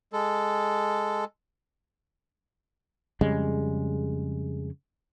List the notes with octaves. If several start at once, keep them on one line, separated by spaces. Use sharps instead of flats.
G#3 A4
F2 C#3 G3 G#3